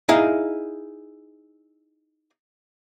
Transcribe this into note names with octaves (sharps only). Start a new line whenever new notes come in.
D#4 E4 G#4 D#5 F5